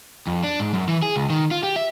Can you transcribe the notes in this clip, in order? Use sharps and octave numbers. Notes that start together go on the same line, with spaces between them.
F2
D4
G#2
F#2
E3
G#4
C#2
D#3
F4
G4
E5